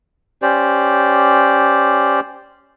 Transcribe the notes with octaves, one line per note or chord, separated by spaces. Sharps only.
C#4 G4 C5 D5